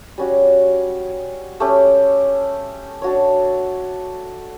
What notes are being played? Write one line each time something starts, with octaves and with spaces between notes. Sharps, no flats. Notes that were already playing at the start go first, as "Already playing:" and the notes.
G3 C#4 F#4
A3 C#4 G4
D4 F#4 C#5